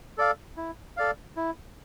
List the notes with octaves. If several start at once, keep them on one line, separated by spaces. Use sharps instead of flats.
A4 D5 F5
E4
A4 D5 F5
E4